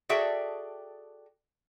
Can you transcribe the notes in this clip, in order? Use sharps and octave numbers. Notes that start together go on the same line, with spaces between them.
F#4 G#4 A4 D5 E5 G5